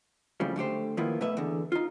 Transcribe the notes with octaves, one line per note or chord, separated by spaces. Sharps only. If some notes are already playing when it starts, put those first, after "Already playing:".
F2 A2 C#3 F3 G3
D3 A3 G4 C5
D#3 F3 A#3 B3 E4
B2 A3 B3 B4 E5
E2 D3
D#4 F4